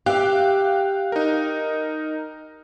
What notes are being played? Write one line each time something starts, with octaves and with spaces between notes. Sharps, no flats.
G4 E5 F5 G5 F#6
D#4 A#4